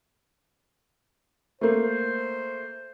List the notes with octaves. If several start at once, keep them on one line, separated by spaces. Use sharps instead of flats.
A3 A#3 C5